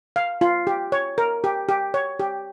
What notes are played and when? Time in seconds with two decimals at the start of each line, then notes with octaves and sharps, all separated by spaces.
0.16 F5
0.41 F4
0.67 G4
0.92 C#5
1.18 A#4
1.44 G4
1.69 G4
1.94 C#5
2.19 G4